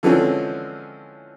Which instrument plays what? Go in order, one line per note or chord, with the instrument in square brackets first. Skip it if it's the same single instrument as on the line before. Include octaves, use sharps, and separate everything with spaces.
[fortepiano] D3 E3 F3 G#3 C4 C#4